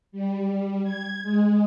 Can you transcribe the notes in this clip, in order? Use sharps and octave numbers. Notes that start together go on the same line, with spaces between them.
G3
G#6
G#3